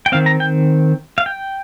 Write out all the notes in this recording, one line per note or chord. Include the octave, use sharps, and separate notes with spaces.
G5
D#3 C4 F5
A#5
G5
F5
G5